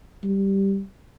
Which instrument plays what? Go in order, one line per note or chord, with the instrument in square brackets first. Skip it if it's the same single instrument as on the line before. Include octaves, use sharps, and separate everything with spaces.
[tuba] G3